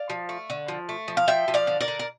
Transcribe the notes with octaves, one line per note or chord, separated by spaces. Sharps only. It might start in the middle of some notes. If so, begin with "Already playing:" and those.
Already playing: D5 F5
F3
A3
D3
F3
A3
F3
F5
F3 E5 G5
F3
D5 F5
D3
A#4 D5
D3
A#4